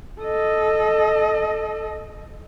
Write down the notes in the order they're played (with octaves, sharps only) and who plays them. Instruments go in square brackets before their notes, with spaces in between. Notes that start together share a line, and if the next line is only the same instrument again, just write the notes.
[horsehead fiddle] A4 D#5